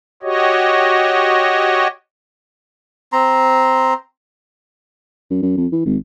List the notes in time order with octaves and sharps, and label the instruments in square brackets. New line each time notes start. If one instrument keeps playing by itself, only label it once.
[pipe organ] F#4 G4 C#5 D#5
[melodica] C4 A#5 C6
[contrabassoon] F#2
F#2
F2
E3
G#1